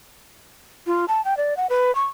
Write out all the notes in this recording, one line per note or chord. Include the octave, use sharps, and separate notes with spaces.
F4
A5
G5
D5
F#5
B4
C#6